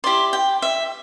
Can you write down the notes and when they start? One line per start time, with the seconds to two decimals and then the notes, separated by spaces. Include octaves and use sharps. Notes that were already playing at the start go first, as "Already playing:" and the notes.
0.04 E4 G4 D5 C6
0.33 G5
0.62 E5